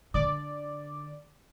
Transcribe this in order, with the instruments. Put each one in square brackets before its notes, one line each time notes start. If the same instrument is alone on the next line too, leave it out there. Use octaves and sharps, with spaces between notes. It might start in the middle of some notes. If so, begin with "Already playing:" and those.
[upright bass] D3 [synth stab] D5